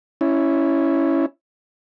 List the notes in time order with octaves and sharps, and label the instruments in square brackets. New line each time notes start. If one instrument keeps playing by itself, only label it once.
[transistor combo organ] C#4 E4